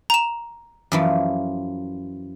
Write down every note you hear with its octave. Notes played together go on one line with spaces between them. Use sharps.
A#5 E7
F#2 E3 F3